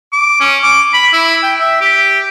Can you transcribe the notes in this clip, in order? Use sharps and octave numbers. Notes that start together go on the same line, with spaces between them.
D6
C#4
D6
B5
E4
G5
E5
G4